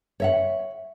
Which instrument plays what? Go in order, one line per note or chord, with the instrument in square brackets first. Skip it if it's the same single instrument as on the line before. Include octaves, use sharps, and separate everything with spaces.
[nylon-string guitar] C#5 E5 F#5